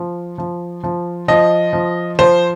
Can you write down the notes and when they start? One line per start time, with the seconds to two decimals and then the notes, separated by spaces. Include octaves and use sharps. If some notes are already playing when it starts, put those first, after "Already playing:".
Already playing: F3
0.38 F3
0.84 F3
1.28 F3 D#5
1.73 F3
2.19 F3 C5